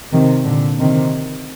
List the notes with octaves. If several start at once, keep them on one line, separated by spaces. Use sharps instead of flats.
C3 D#3
A#2 D3
C3 D#3